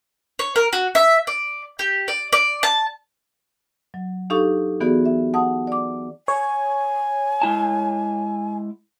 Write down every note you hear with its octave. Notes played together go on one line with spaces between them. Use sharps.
C#5
A#4
F#4
E5
D5
G4
D5
D5
A5
F#3
D4 D#4 G4 A4 F5 C#6
E3 B3 F#4 G#4 D5
E5
F#5 A5 D#6
D5 D6
C#5 G#5
G#3 E4 A5